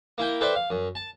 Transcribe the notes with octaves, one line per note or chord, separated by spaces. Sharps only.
A#3 E4 G5
A4 B4 C5 D5 E5 G5
F5
F#2
A5